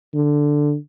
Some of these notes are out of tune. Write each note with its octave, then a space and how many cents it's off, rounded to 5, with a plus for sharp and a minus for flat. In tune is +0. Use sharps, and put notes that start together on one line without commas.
D3 +5